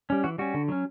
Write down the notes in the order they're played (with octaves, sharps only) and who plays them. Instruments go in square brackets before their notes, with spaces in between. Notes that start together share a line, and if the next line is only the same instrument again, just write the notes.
[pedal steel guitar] G3 C#4
E3 F#4
G3 C#4 F#4
D3
F#3 C#4